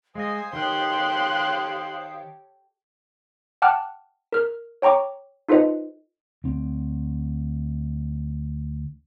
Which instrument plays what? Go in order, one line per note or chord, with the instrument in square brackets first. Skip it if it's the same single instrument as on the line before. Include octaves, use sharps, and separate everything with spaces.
[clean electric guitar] G#3 D#5 [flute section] C5 F5 D#6 [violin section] G#5
[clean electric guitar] D#3 [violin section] G4 A4 C#5 [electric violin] C6 F#6
[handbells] F#5 G5 A5 D6 F6 F#6
A#4 F6
C#5 G5 A#5 C#6 D6
D#4 F4 A4 B4 C5 D#5
[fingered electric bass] D2 C4